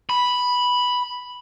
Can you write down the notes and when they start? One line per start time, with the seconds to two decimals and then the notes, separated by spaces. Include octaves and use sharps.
0.10 B5